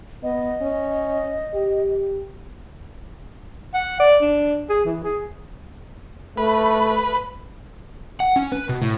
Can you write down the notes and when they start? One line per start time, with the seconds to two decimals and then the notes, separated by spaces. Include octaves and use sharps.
0.23 B3 D#5
0.62 C#4
1.54 G4
3.74 F#5
4.00 D5
4.21 D4
4.70 G#4
4.85 E3
5.04 G#4
6.37 A3 B4
8.20 F#5
8.36 C#4
8.52 B4
8.69 B2
8.82 A2